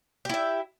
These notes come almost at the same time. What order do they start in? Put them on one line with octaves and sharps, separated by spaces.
G4 E4 E5